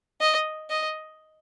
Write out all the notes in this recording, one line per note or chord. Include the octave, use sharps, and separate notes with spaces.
D#5
D#5